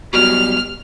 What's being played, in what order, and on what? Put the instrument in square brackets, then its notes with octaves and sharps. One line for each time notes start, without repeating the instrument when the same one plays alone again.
[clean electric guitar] B2 F#3 G3 [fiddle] F6